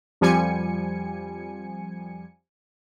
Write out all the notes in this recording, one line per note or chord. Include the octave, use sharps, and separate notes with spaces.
F2 F3 G3 G#5 C#7